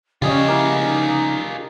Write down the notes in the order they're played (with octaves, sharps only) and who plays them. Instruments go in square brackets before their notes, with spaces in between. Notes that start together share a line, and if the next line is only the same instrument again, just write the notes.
[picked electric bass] C#3 F3 [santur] G3 D#5 [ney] C#4 [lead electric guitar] F4 G#4
[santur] A#3 [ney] E4
[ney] D#4